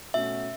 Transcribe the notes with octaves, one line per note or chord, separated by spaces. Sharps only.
B2 A3 C#4 F#4 E5